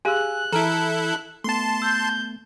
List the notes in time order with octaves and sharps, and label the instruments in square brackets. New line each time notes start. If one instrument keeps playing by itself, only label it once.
[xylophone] G4 G#4 F5 [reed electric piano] G#5 E6 [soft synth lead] F#6
[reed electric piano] E3 [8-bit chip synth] E4 A4 [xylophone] A#5 F6 D7
[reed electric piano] A3 B3 [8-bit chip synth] A5 C6
[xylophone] E6 [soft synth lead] G6